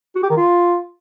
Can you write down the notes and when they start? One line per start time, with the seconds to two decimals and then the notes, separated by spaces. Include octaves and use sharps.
0.16 F#4
0.23 G4
0.30 D#3
0.37 F4